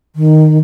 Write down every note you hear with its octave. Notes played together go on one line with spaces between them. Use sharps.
D#3